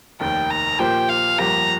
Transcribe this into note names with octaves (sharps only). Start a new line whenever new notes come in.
F1 D#2 D#3 G5
A#5
A#2 F3 A#3 G4 C5 G5
F5
G1 F2 F3 A#3 G4 A#5